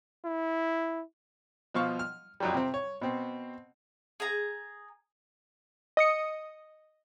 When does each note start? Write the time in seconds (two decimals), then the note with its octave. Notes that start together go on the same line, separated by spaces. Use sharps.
0.25 E4
1.74 B2 F3 F5 C#6
1.99 F6
2.40 F2 F#3 G3
2.54 C3 C4
2.74 C#5
3.01 B2 C4
4.20 G#4 A#5
5.97 D#5 D#6 C#7